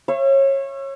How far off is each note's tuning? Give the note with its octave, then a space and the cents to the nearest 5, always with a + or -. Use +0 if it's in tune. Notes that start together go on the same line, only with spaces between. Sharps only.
C#5 -25 E5 +40